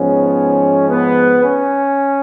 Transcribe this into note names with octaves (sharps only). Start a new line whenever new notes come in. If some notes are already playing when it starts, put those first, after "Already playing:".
Already playing: G#2 F3 B3 C#4
B3
C#4